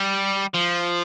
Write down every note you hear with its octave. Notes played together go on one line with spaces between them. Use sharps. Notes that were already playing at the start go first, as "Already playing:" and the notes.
Already playing: G3
F3